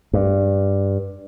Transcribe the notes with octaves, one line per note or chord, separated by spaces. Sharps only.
G2